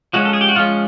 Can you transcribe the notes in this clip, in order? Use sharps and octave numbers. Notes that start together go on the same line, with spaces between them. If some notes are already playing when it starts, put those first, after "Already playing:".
F3 G#3 C#4 F#4
A4
G#4
G4
F#4
F3 G#3 C#4 F4